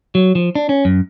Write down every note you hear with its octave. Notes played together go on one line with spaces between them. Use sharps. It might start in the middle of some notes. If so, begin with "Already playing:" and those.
F#3
F3
D4
C#4
F#2